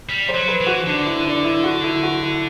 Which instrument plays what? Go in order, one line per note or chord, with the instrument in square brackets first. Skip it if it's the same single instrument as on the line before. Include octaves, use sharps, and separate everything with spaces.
[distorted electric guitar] G3
[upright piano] C5
[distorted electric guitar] F#3
[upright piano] B4
[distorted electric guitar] E3
[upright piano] F#4
[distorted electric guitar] D3 [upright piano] D4
[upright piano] E4
D4
E4
F#4
E4
F#4
E4